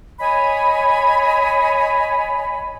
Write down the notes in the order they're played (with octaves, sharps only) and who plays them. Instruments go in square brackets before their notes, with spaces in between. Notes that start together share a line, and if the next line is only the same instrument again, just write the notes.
[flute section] C#5 D#5 G#5 B5